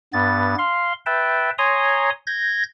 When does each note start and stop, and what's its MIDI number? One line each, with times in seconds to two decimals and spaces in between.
0.13 0.55 43
0.13 0.55 59
0.13 0.55 93
0.58 0.93 77
0.58 0.93 84
1.06 1.50 71
1.06 1.50 76
1.06 1.50 79
1.06 1.50 81
1.58 2.10 73
1.58 2.10 80
1.58 2.10 82
1.58 2.10 84
1.58 2.10 87
2.27 2.63 91
2.27 2.63 92
2.27 2.63 94